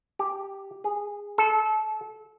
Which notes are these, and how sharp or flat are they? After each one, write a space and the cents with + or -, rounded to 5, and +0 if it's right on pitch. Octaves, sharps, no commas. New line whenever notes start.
G4 +0
G#4 -15
A4 -25